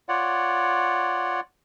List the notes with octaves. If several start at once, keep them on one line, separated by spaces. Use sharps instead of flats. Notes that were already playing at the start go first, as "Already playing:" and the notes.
F4 C#5 D5 F#5